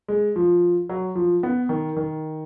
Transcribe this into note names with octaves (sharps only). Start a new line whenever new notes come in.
G#3
F3
F#3
F3
B3
D#3
D#3